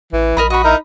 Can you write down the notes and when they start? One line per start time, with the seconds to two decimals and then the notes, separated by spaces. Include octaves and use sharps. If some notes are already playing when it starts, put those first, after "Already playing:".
0.13 A1 E3
0.37 A#1 A#4 D#5 B5
0.50 F#4 D#5 B5
0.64 D#4 E4 A#4